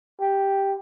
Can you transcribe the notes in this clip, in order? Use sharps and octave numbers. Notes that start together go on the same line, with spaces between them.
G4